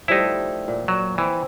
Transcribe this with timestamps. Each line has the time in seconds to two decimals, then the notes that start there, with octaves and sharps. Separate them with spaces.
0.08 F3 G3 A3 D#4 E4
0.68 A#2
0.88 F#3
1.18 E3 C4